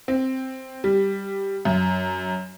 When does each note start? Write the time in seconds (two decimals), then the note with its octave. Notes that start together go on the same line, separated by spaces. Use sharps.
0.08 C4
0.84 G3
1.65 F#2